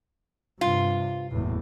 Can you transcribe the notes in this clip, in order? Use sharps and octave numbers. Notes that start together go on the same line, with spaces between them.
G2 C3 F4
F#1 E2 A2